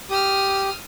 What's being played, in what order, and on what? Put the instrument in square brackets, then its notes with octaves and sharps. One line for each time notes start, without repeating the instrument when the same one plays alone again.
[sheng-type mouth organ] G4 [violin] D#6 F6